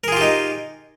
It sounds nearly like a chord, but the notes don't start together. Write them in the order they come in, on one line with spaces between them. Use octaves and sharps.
A#4 G#4 F4 G4 D#4